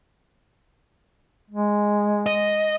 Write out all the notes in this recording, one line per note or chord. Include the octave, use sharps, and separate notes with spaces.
G#3
D#5